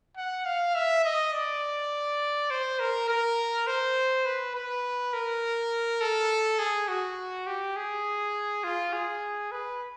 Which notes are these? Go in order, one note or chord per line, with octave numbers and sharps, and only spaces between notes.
F#5
F5
E5
D#5
D5
C5
A#4
A#4
C5
B4
B4
A#4
A4
G#4
F#4
G4
G#4
F4
G#4
B4